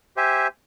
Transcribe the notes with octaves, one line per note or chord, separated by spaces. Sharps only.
G4 C5 E5 G#5